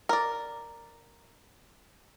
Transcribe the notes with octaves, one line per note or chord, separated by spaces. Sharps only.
A#4 D5